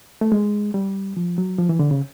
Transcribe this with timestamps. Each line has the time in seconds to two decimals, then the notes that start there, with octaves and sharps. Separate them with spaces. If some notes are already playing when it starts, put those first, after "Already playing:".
0.21 A3
0.32 G#3
0.74 G3
1.17 F3
1.38 F#3
1.59 F3
1.69 E3
1.79 D3
1.91 C#3